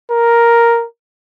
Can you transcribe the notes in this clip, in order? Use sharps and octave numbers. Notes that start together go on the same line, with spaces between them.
A#4